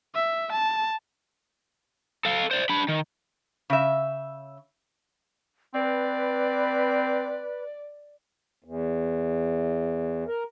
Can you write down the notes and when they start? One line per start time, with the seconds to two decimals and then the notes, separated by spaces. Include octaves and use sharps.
0.15 E5
0.52 A5
2.25 A4 F5
2.51 C5 D5
2.69 D4 B5
2.88 D#3
3.70 C#3 E5
5.74 C4 B4 D5
8.64 E2
10.27 A#4